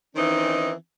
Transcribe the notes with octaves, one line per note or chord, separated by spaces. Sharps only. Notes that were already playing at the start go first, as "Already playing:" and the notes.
D#3 E3 C4 C#4 D#4